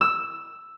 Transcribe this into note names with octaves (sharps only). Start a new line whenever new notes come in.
E6